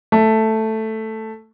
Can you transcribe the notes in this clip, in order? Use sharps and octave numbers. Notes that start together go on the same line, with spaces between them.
A3